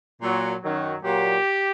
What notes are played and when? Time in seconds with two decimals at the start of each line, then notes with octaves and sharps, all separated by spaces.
0.22 A#2 F#3
0.62 F#2 D#3 F#3
1.03 A#2 F#3 G4